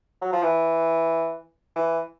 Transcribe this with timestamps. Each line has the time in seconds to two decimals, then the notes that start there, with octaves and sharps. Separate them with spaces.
0.22 F#3
0.32 F3
0.43 E3
1.76 E3